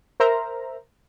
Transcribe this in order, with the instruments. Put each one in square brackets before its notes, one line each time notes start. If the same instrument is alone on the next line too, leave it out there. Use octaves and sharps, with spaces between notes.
[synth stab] A#4 C5 E5 A#5